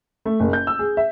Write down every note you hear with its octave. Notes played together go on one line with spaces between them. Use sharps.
A3
F#1
G6
E6
G#4
E5